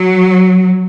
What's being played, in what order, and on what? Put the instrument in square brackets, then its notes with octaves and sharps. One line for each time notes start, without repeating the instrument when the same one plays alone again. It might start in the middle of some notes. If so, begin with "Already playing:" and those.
Already playing: [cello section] F#3